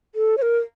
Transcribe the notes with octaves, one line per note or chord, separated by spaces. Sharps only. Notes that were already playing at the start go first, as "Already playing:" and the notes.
A4
C#5
A#4